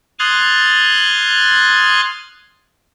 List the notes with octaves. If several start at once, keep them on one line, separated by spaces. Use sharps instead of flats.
C6 D#6 F6 F#6 G#6 A6